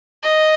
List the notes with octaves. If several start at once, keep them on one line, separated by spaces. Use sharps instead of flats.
D#5